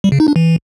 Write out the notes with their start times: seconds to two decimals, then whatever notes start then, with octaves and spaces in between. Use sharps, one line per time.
0.04 G3
0.12 C#3
0.20 D#4
0.28 D4
0.36 E3